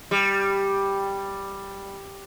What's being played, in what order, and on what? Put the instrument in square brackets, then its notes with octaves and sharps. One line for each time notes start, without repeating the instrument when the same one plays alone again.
[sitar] G3